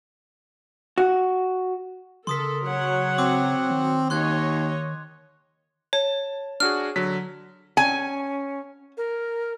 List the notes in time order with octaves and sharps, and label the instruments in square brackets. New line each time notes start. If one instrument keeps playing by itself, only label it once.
[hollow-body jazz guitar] F#4
[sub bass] C#3 [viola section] A4 A#4 [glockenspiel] C6 D#6 B6
[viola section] F#3 C#5 F#5
[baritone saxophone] C4 [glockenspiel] D6
[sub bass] D#3
[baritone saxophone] D#2 [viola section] C#5 D#5 [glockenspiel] C6 F#6 G#6
[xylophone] C#5 [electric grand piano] A5
[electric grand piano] D4 F#4 G#4 [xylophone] F6
[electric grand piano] D3 F#3 B6
[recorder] C#4 [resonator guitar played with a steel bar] G#5
[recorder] A#4